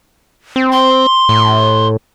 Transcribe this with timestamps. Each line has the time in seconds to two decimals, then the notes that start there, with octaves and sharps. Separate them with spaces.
0.56 C4
0.72 C6
1.29 A2